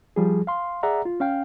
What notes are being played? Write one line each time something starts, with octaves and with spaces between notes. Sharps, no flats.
F3 G3 G#4
F5 C6
G#4 D5 E5 F#5 A#5
F4
C#4 F5 G5